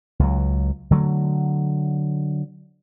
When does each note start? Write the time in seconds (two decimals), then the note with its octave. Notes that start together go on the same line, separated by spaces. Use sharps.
0.19 C#2 F#3
0.91 D3 F#3 G#3 A3